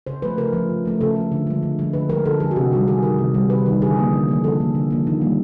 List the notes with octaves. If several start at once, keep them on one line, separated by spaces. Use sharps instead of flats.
C#3 C5
F3 A3 B4
C#3 A#4
F3 A3
C#3
F3 A3
C#3 A4
F3 A3
D3
F3 G#3
D3
F3 G#3
D3 B4
F3 G#3 A#4
D3 A4
F3 G#3 G#4
F#4
C3 G4
D#3 G3 F#4
C3 G#4
D#3 G3 A#4
C3
D#3 G3
C3 B4
D#3 G3
D3 G#4
F3 A#3
D3
F3 A#3
D3 A4
F3 A#3
D3
F3 A#3
D#3
G3 A#3